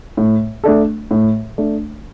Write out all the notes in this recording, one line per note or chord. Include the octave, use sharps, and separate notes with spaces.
A2
A3 D4 A4
A2
A3 D4